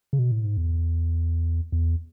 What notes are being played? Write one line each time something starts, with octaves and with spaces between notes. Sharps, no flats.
C#3
B2
A2
G#2
E2
E2